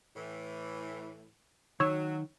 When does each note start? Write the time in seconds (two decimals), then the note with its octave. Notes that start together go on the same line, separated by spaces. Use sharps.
0.16 A2 E3
1.80 D#3 F#3 C#5 E6